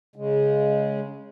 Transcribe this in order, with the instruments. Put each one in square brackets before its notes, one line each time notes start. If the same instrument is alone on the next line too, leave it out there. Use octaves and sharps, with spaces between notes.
[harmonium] C#3 G#3